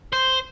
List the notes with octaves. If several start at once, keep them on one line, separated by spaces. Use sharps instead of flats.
C5